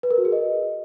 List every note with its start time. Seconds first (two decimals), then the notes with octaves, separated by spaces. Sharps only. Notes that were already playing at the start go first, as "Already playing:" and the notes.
0.03 B4
0.11 A#4
0.18 F#4
0.25 G#4
0.32 D#5